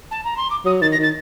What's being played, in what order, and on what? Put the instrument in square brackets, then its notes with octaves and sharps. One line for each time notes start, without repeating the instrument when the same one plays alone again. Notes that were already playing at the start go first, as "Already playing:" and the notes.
[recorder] A5
A#5
C6
D6
[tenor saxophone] F#3 [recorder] D#6
[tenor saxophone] D#3 [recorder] A6
[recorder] A#6
[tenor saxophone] D#3 [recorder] A6